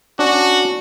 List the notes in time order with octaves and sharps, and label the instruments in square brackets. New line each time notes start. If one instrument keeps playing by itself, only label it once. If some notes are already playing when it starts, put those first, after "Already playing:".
[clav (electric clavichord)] C#4 D4 [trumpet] F#4